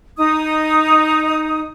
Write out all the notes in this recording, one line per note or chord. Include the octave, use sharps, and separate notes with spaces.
D#4 D#6